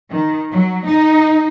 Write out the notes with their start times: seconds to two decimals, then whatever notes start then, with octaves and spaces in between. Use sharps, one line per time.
0.11 D#3
0.51 F#3
0.86 D#4